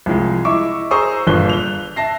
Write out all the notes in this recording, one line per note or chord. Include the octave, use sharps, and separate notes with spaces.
C2 F3 G#3
E4 D#5 E5 C#6 D6
G#4 C5 A#5 C#6 D#6 E6
G1 A#2 F4 F#6 G7
F7 G7
E5 A5 A#6 C7